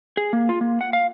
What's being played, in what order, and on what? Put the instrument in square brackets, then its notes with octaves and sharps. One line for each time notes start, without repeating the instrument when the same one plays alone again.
[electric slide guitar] G#4
A#3
F4
A#3
F#5
F5